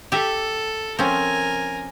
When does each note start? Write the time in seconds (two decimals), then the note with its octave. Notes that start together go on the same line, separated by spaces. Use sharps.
0.12 G4 A4 E5
0.99 F3 C4 C#4 A#4 G#5